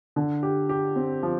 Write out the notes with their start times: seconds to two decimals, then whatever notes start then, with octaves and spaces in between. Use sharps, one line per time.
0.16 D3
0.43 G4
0.69 G4
0.96 C4
1.23 F3